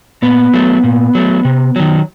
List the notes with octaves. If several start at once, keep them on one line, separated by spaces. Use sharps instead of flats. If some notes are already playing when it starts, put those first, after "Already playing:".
A#2 B3
F#3 A3
A#2
F#3 A3
C3
D#3 F#3